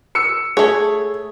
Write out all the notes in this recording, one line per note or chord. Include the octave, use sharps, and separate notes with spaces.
E6 C#7
A3 G#4 C#5